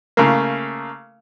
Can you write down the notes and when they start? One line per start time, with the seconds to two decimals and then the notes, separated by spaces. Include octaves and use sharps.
0.17 C#3 A3 A#3